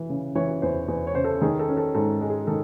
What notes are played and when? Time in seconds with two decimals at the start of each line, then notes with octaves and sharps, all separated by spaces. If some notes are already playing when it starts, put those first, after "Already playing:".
Already playing: E3
0.10 C#3
0.35 E3 C#5
0.62 E2 C5
0.88 E2
1.07 C#5
1.15 C#3 C5
1.24 A4
1.42 D#3 G#4
1.59 A4
1.68 C#4
1.77 A4
1.95 G#2 A4
2.21 G#3
2.30 G#4
2.47 D#3 A4